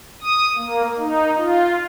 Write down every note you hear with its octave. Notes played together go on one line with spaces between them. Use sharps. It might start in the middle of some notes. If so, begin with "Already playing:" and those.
D#6
A#3
D#4
F4